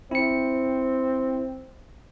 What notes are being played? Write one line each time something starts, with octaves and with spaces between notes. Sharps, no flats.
C4 E4 C#7